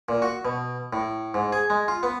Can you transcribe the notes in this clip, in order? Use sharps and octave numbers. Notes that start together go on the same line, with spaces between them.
A#2
F#4
B2
A2
G#2
G#4
G#3
F4
B3